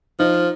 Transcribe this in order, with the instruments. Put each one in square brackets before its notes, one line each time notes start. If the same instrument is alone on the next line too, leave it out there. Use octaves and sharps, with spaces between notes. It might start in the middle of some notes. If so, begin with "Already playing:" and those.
[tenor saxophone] F3 [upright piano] D#4